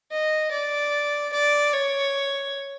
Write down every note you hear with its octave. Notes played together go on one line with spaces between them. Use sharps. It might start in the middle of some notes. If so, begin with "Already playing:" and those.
D#5
D5
D5
C#5